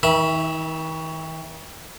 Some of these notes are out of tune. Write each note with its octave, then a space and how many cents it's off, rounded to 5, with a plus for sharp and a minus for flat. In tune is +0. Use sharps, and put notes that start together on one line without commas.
D#3 +45 E5 -5 B5 -25